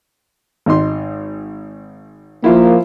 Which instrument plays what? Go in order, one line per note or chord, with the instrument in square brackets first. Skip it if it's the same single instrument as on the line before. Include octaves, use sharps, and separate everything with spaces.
[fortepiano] G#1 D#4 C6
[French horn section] F3 A#3 [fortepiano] E4 F4